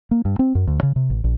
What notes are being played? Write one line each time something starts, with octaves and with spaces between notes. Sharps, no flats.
A#3
G2
C4
F#2
D2
C#3
C3
A1
A#1